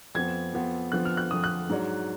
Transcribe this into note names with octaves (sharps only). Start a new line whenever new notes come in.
F2 F3 B3 G#6
F2 F3 B3
F2 D3 F3 B3 F#6
F6
F#6
F2 D3 F3 B3 D#6
F#6
G#2 F#3 D4